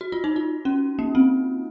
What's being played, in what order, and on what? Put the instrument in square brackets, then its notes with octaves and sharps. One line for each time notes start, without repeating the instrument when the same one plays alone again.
[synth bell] F#4
F4
D#4
F4
C#4
A#3
C4